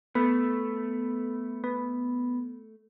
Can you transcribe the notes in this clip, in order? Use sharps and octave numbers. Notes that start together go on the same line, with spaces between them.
A3 B3
B3